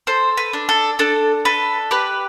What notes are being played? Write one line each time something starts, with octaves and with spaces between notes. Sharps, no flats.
A4 C5
B4
D4
A4
D4 A4
A4 B4
G4 B4